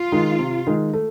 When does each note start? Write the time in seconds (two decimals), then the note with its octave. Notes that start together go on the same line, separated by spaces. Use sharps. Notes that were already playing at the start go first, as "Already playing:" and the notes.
Already playing: F4
0.12 D#3 G#3
0.39 C3
0.67 D#3 G#3
0.93 A3